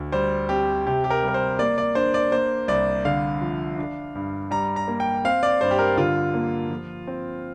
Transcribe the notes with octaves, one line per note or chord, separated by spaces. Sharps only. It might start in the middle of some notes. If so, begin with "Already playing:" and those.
Already playing: D2
G3 C5
C4 G4
C3 G4
G4
A#4
G3
A#4
C5
A#3 D5
D5
D4 C5
D5
A#3 C5
C2 D5
D3 F5
F3
D4
G2
G3 A#5
A#5
A#3
G5
C4 F5
D5
G2 C5
G4
A#4
D3 F4
A#3
F3
C4